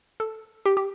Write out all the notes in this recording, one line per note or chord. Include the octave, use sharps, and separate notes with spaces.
A4
G4
G4